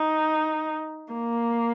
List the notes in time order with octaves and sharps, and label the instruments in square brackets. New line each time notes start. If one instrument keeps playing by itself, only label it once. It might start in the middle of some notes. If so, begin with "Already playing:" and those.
Already playing: [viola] D#4
A#3